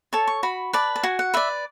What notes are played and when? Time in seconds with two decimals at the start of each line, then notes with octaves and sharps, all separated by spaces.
0.13 A4 C#5 A5
0.27 C#6
0.43 F#4 B5
0.73 B4 D5 A5
0.96 A5
1.03 F#4 G#5
1.19 F#5
1.34 B4 D5 E5